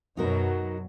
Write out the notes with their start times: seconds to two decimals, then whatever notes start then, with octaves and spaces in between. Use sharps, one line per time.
0.17 F#2 B2 F#3 D#4 F#4 A#4